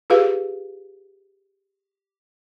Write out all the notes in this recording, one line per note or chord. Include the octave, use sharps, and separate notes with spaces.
F4 G4 G#4 B4 F5